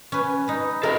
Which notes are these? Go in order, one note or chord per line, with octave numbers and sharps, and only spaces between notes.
C#4 B4
D#4 B4
A4 A#4 D#5